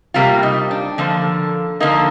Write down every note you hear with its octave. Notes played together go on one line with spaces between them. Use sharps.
C3 G3 A#3 F4
D#4
D4
D3 F3 A#3
D3 F3 A#3 D#4